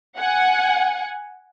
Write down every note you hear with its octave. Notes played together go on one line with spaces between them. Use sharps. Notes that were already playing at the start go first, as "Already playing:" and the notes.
F#5 G#5